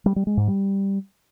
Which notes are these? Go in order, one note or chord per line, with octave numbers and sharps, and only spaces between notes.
G3
G3
G#3
G#2
G3